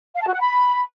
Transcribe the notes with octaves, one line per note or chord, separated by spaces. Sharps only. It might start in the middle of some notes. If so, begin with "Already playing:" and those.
F5
A5
F#4
F#5
B5